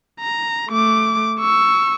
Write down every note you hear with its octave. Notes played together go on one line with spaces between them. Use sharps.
A#5
A3 D6
C#6 E6